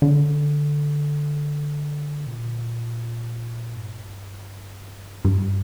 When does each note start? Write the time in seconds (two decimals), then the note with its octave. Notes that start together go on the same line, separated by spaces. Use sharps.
0.02 D3
2.27 A#2
3.76 G2
5.25 G2